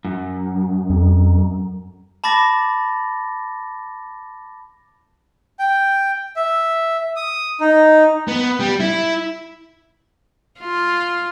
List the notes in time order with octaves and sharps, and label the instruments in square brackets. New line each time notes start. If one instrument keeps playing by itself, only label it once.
[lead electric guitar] F#2
[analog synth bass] F2
[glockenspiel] A5 B5 D6 A6 A#6
[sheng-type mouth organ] G5
E5
D#6
D#4
[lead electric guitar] B3
G3
E4
[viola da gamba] F4